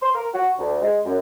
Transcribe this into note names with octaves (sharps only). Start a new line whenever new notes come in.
C6
A#4
F#4
D2
G#3
F#2